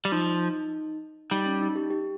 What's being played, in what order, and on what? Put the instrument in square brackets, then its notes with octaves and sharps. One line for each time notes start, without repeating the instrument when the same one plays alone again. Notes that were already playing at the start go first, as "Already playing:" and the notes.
[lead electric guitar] G3
[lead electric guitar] F3 [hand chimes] D#4
[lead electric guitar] G3 [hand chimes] D#4
[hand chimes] C#4
D#4
G4
G4